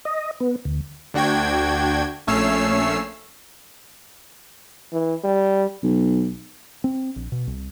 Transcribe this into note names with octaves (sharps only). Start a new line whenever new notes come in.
D#5
B3
D2
D2 D4 F#4 G5 G#6
A#1 A3 C#4 C#5 E6 C7
E3
G3
B1
C4
A#1
B2
C2